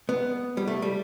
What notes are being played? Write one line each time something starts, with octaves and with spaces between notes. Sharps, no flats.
B3
G3
A3
G3